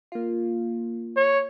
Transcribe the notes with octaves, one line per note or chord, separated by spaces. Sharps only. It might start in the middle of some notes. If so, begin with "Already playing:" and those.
A#3 F4
C#5